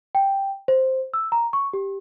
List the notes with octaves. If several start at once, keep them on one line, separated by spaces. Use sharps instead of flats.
G5
C5
E6
A#5
C#6
G4